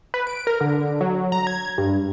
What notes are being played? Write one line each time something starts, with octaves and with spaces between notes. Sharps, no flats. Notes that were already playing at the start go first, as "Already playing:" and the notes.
B4
D7
A#4
D3
F#3
A#5
G#6
G2